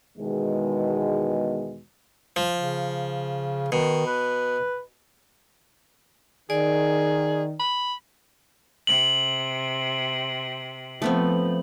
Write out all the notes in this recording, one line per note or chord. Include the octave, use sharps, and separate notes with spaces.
E2 B2 D#3 G#3
F3
C#3
B2 D#3
B4
D#3 G#4 D5
B5
C3 F#7
F3 A3 B3 C4